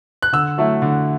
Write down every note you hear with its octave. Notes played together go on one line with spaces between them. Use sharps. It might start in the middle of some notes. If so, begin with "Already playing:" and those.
F#6
D3 E6
F#3 A3 E4
D3